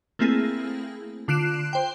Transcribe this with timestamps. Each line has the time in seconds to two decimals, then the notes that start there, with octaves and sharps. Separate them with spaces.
0.19 A3 A#3 C4 E4 G#4
1.28 D3 F4 F#6 C7 D7 E7
1.73 C5 G5